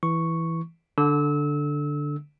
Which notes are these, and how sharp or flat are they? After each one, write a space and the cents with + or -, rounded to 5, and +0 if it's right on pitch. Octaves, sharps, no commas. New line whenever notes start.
E3 +0 C#6 +0
D3 +0 E6 -30